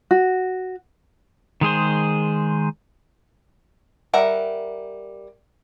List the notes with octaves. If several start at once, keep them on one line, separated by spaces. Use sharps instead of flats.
F#4
D#3 G#3 G#4 C5
G3 A#4 E5 F#5